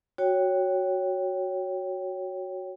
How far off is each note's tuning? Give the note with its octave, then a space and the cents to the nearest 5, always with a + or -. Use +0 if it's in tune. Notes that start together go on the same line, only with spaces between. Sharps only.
F#4 +0 C#5 +0 G5 +0